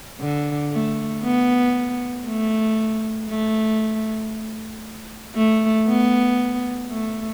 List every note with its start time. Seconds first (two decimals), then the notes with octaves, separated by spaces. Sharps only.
0.20 D3
0.72 A3
1.24 B3
2.26 A3
3.29 A3
5.36 A3
5.88 B3
6.91 A3